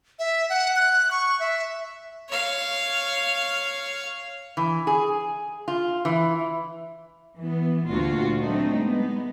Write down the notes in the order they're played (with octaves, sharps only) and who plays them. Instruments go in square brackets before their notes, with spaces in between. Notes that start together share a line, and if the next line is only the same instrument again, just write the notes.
[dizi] E5
F#5
F#6
C#6
E5
[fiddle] C#5 F5
[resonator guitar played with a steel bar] E3
G#4
F4
E3
[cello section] E3 B3
D2 A#2 A#3 D4 F4 F#4
F#3 A3 C4 D4 D#4
G#3 B3